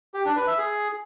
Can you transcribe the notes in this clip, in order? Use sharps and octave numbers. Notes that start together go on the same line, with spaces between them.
G4
D4
B4
E5
G#4